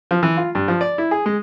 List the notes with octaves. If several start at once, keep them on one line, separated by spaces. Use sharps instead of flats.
F3
E3
F4
G2
F3
D5
E4
G#4
G#3